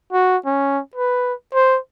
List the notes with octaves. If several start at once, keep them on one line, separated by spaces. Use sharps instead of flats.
F#4
C#4
B4
C5